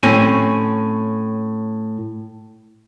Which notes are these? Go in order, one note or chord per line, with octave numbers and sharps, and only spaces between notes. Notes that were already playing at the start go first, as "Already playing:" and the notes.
A2 C4 C#4 G#5